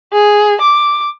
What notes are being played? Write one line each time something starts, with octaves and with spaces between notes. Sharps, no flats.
G#4
D6